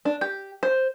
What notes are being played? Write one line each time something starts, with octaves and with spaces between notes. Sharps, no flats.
D4
G4
C5